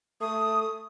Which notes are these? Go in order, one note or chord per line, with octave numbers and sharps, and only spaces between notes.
A3 D#6